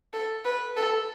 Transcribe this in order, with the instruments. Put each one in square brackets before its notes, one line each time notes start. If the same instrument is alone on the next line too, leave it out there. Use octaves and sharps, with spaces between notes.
[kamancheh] A4
B4
A4